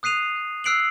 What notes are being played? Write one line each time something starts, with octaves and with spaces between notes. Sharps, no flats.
D#6 F#6 C7 D#7 F7
E6 F#6 C7 D7 F7 F#7